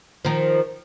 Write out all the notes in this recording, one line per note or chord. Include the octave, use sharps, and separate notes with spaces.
D#3 F3